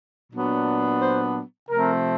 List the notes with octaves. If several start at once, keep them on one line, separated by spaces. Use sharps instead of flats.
A#2 F#3 B3 D4
C5
C3 F3 A3 C4 A#4